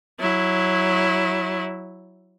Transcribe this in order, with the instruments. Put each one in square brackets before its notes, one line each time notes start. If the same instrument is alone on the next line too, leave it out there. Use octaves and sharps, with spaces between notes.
[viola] F#3 E4